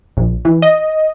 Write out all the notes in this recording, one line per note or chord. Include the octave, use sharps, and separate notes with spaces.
A#1
E3
D#5